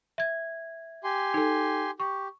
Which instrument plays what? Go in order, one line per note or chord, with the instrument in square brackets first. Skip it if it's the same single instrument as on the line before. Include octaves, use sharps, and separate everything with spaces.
[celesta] E5 G#6
[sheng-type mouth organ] G4 G#5 C6
[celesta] D#4 A4
[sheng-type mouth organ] G4 [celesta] C#6